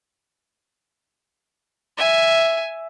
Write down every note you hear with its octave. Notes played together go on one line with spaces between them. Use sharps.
E5 G#5